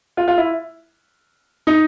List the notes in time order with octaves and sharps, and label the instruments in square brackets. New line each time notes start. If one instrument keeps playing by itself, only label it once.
[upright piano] F4
F4
E4
D#4